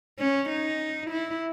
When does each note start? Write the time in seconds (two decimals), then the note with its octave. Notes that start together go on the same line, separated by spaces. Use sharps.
0.19 C#4
0.49 D#4
1.10 E4